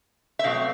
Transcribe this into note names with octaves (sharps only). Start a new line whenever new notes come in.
E5
B2 F#3 A3 C4 F5